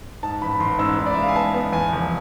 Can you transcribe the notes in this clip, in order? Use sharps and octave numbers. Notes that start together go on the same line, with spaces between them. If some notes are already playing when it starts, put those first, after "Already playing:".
G#2 A5
A1 B5
A1 C6
G#2 E6
G#2 B5
D5
E5
G#3 F5
G#5
B3 A5
B3
E2 G#5
F1